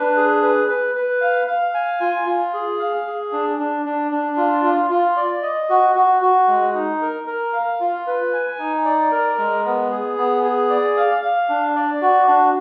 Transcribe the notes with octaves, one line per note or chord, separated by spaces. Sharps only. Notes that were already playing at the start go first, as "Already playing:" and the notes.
Already playing: D4 B4
G#4
B4
B4
B4
F5
F5
G#5
F4
F4
G#4
F5
G#4
D4
D4
D4
D4
F4
F4
F4
D5
D#5
F#4
F#4
F#4
G#3
D#4
A#4
A#4
F5
F4
B4
G#5
D#4
D5
A#4
G#3
B3
G#4
B3
G#4
D5
F5
F5
D4
D5
F#4
D4